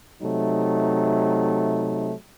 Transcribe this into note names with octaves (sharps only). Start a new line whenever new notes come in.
C3 F#3 A3 D#4